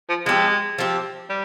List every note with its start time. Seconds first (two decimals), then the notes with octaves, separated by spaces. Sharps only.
0.09 F3
0.26 F3 G#3 C4 G4
0.78 F3 C4 G4
1.29 G3